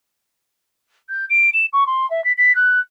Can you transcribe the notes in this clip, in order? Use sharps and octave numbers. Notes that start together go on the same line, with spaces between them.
G6
D7
E7
C#6
C6
E5
B6
B6
F#6